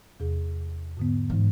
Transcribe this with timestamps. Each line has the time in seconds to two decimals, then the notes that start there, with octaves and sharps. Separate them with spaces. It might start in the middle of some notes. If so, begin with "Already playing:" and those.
0.20 E2 C3 G#4
0.97 G#2 D3 B3
1.30 G#2 B2 E3